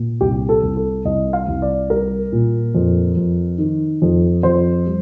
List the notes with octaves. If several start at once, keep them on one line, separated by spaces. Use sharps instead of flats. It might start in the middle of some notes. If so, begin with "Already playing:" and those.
Already playing: A#2
C2 G4
A4
C2
A4
C2 D#5
F5
C2
D5
G3 A#4
A#2
F2
F2
D#3
F2
F2 C5
G3